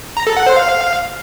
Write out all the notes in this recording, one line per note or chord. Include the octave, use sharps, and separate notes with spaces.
A#5
A4
F#5
C5
F5